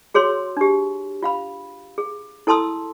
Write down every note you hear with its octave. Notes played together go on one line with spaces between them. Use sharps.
F#4 G#4 C#5 C6 E6
D4 G4
F4 F5 B5
G#4
E4 A4 A5 C6 D#6 E6